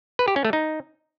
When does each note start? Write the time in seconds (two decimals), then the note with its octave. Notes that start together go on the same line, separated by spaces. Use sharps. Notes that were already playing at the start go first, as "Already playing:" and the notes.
0.19 B4
0.28 G4
0.36 C#4
0.45 A3
0.53 D#4